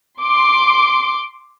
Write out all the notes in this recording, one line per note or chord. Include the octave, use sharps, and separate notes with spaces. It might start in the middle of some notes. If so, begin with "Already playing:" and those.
C6 D6